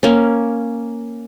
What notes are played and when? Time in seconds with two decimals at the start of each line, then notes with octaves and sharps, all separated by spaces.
0.03 A#3 C#4